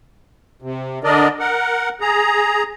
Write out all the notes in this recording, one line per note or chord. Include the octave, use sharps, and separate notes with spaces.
C3
D3 D4 A#4 D5 D#5
A#4 F#5
G#4 A#5